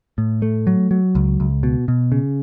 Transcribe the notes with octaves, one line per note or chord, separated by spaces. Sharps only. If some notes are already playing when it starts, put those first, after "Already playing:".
A2
A3
F#3
F#3
C#2
C#2
B2
B2
C#3